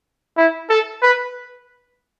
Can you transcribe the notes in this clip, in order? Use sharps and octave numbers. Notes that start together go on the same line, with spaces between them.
E4
A4
B4